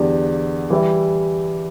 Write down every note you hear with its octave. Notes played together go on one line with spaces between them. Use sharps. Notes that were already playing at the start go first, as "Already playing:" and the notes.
Already playing: E2 D3 G3 D4 G4
E3 G3 E4 G4